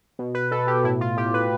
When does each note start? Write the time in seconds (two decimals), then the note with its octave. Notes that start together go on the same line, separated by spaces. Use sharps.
0.19 B2
0.35 B4
0.51 B2 A4
0.67 G4
0.84 A2 E4
1.01 F4
1.17 A2 G4
1.34 B4